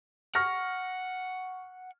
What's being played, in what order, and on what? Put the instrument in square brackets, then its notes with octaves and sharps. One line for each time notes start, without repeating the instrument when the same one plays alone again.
[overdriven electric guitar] F#5 [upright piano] C#6 F6 A#6